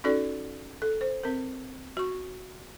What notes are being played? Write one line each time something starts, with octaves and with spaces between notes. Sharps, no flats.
C#4 D#4 F#4 A4 D5
A4
C5
C4 A#4
F#4 C#6